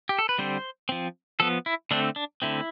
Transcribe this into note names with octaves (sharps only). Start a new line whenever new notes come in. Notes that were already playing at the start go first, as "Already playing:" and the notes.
G4
A4
B4
D3 G3 C4 C5
F3 C4
F3 B3 A4
E4
D3 A3 C4 D4
D4
D3 A3 C4 E4